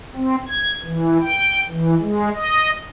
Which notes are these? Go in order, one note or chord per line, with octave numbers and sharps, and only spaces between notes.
C4
G#6
E3
G5
E3
G#3
D#5